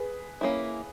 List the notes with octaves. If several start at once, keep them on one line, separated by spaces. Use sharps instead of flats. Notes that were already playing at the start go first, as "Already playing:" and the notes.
Already playing: G#4 B4
A#3 C#4 E4